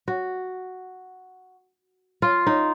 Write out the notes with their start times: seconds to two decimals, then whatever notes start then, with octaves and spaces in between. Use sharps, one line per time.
0.08 F#4
2.22 F4
2.46 D#4